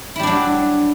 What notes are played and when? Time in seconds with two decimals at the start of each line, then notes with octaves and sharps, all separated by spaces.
0.16 E4
0.19 G3
0.23 D4
0.27 F#3